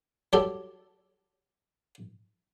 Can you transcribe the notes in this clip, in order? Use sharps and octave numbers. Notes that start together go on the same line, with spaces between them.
F#3 G3 G4 A4 D5